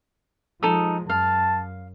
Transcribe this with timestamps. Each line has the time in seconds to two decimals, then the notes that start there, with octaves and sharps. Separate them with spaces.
0.63 F3 G#3 D#4 A4 D#6
1.10 F#2 F5 A5